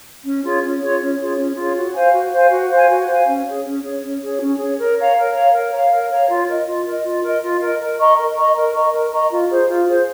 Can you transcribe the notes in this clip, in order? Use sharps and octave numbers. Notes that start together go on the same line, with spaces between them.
C#4
F4 G#4 C#5
C#4
F4 G#4 C#5
C#4
F4 G#4 C#5
C#4
F4 G#4 C#5
F#4
C5 F5 G#5
F#4
C5 F5 G#5
F#4
C5 F5 G#5
F#4
C5 F5 G#5
C#4
G#4 C#5
C#4
G#4 C#5
C#4
G#4 C#5
C#4
G#4 C#5
A#4
C#5 F5 A#5
A#4
C#5 F5 A#5
A#4
C#5 F5 A#5
A#4
C#5 F5 A#5
F4
A#4 D#5
F4
A#4 D#5
F4
A#4 D#5
F4
A#4 D#5
A#4
D#5 A#5 C#6
A#4
D#5 A#5 C#6
A#4
D#5 A#5 C#6
A#4
D#5 A#5 C#6
F4
G#4 C5
F4
G#4 C5